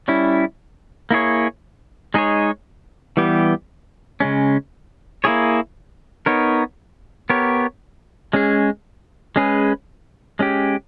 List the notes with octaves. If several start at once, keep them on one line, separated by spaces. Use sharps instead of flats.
G3 C#4 E4
A#3 E4 G#4 C#5
G#3 D#4 G#4 C#5
E3 G3 B3 G4
C#3 G#3 C#4
A#3 E4 G#4 C#5
B3 D#4 A#4 C#5
B3 G4 A#4 C#5
G#3 C#4 G#4
G#3 C#4 G#4 B4
G#3 C#4 G4